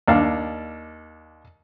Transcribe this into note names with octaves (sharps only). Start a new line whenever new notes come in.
D#2 D4 F5